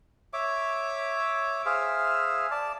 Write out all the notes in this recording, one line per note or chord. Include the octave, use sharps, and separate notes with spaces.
C#5 E5 D6
G#4 C5 E5 F5
D5 A5